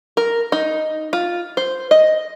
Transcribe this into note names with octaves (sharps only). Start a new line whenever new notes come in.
A#4
D#4
F4
C5
D#5